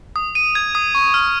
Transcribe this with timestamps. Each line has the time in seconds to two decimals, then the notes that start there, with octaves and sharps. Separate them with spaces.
0.16 D#6
0.35 D#7
0.55 G#6
0.75 D#6
0.95 C#6
1.14 F6